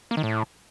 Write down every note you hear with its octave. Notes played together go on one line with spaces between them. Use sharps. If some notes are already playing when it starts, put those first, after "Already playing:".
A#3
D#3
A2